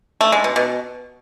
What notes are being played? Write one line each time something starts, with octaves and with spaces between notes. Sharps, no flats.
A3
G#3
B2
B2